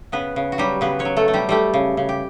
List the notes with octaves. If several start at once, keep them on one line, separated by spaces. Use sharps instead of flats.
C#3 B3 B4
C#3
F#4
F#3 G3 G4
C#3 B3 B4
C#4 C#5
F#3
A3 A4
A3
G3 G4
G3 A3 G4
C#3
C#3
G4